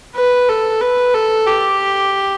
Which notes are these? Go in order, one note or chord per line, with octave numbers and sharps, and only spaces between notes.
B4
A4
B4
A4
G4